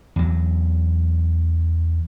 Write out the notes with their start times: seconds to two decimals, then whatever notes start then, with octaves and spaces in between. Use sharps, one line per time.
0.16 E2 F#3